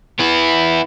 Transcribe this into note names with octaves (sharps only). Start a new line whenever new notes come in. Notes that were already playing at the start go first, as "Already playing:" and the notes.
B3 E4